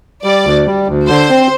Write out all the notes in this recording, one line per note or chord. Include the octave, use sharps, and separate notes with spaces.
G3 D5
D2
G3
D2
D3 C5
C4